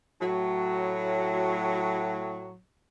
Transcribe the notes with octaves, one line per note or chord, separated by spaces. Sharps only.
A2 F#3